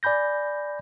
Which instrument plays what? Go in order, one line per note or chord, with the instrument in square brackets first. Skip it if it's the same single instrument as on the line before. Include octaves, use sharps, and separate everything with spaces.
[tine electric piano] D5 G#5 B5 G6 A#6